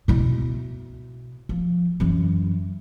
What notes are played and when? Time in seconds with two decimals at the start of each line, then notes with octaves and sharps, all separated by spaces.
0.08 B2 E4
1.49 F3
2.00 F#2 E3